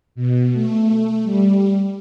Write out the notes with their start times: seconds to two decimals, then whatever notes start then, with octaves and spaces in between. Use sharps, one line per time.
0.15 B2
0.53 A3
1.23 G3